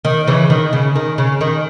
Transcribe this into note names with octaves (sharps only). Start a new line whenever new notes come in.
D#3
C#3 E3
D#3
C#3
D#3
C#3
D#3